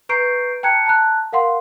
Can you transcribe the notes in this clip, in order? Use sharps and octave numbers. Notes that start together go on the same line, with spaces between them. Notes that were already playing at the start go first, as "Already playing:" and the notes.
B4 A#5 C#6 G6 C7 D7
G5 A5 A#5 F#6 G#6 C#7
A5 A#5 F#6
A#4 F5 F#5 C6